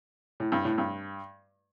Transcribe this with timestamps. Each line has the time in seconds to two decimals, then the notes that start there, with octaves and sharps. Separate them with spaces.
0.40 A2
0.52 G2
0.65 A2
0.78 G2